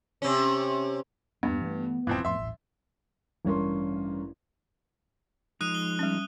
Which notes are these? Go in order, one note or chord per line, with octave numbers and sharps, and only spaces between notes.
C3 C#4
E2 G2 A#3 B3 D4
E3 F#3 A3
E1 G#2 E3 F3 C4
F2 A2 E5 C6
D#1 A1
A1 G2 C#4 A#4 C6
F3 G#3 D#4 D#6 F#6 D#7
G7
G3 C#4